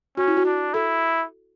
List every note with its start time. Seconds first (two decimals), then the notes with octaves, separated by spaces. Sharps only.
0.17 C#4 F#4
0.28 E4
0.37 F#4
0.46 D4
0.74 E4 A4